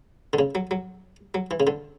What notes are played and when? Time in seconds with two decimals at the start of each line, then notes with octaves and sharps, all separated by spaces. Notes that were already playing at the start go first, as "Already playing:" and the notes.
0.33 D3
0.39 C#3
0.55 F#3
0.71 F#3
1.34 F#3
1.51 E3
1.60 C#3
1.67 D3